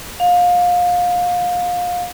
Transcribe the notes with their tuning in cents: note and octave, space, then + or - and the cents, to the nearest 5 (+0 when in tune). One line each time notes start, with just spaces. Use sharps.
F5 +25